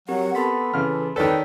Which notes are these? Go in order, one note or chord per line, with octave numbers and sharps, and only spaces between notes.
F#3 C4 G4 A#4 F#5
B3 A4 B5 C6 B6
C#3 E3 F6
D#3 A4 B4 C#5 D5 G5 B6